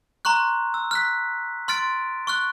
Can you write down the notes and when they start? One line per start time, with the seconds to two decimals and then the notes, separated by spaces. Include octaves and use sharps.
0.25 A#5 C6 C#6 F#6
0.74 E6
0.91 F6 F#6 B6
1.68 C6 F6 A6 D7
2.27 C#6 F6 F#6